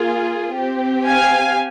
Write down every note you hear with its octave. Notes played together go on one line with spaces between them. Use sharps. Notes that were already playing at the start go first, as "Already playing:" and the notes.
Already playing: A#3 F4 G#4
C4 G4
F5 G#5